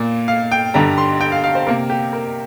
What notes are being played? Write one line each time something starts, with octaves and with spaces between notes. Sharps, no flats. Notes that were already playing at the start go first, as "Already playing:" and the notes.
Already playing: A#2 A#3
F5
G5
G2 D3 G3 A#5
C6
G5
F5
F5
C5
C3 A#3 A#4
G4
A#4